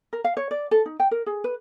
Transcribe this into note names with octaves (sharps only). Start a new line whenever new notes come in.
A#4
F5
C#5
D5
A4
D#4
G5
A#4
G#4
B4